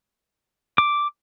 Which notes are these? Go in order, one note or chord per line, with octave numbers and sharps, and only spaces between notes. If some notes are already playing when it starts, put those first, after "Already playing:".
D6